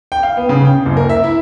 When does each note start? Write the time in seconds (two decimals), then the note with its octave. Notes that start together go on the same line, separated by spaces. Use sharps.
0.12 G5
0.23 F5
0.37 B3
0.49 C#3
0.65 G5
0.85 F#1
0.97 A#4
1.09 E5
1.24 E4